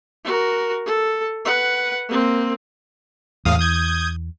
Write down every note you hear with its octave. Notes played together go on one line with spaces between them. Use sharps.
F#4 A#4
A4
B4 F#5
A#3 C4
E2 A2 F5 D#6
D#6 G6 G#6